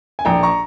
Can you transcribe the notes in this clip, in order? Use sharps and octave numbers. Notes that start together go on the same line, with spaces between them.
G#5
A#1 G5 A#5
A#5 C#6